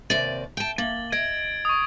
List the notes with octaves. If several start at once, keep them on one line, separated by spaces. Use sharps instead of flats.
D#2 C3 D5
G5 A5
A#3 A6 F#7 G7
D#5 G#6 D7
C#6 D#6